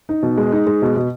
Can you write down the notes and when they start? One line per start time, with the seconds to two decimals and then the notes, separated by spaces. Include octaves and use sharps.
0.09 D#4
0.22 B2
0.37 G#3
0.52 D#4
0.67 G#3
0.82 B2
0.96 B2